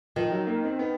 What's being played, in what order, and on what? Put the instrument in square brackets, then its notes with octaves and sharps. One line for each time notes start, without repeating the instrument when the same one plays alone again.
[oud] D#3 [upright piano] F3
[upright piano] F#3
A#3
C4
B3